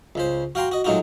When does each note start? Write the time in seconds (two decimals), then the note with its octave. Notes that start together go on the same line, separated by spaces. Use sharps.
0.15 C#2 C#3 C5
0.55 F#4 F5 G5 A#5 C6
0.72 F#4 D#5
0.84 F#3 G#3 A3 D#4 F4 F#4